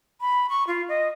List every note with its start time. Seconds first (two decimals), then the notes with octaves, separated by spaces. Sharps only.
0.21 B5
0.49 C#6
0.67 F4
0.89 D#5